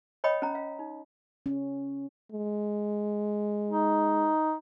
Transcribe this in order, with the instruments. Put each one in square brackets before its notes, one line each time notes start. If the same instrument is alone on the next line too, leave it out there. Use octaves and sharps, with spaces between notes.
[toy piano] C#5 D#5 G5 B5 D#6
C#4 A#5
F5
D#4
[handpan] C#4
[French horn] G#3
[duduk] D#4